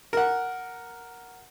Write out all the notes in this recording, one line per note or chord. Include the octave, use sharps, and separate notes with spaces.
A#4 F#5